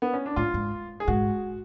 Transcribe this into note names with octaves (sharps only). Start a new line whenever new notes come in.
B3
C#4
D4
A2 F4
G#2
G#4
G#2 F#4